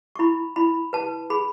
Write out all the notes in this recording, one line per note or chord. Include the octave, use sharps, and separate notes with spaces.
C#6
E4 B5
E4 B5
B4 A5
G#4 B5